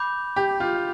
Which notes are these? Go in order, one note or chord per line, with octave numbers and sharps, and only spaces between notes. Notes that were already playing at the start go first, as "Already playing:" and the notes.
Already playing: B5 D6 G6
G4
F4